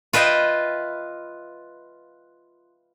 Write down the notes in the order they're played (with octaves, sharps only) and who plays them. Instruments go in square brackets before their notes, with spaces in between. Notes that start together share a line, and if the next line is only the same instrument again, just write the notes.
[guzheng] F4 B4 D#5 E5 G5